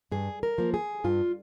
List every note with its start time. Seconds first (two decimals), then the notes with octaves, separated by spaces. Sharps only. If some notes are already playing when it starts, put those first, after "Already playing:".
0.11 G2 G#4
0.43 A#4
0.58 F3 A#3
0.74 G#4
1.04 G2 F4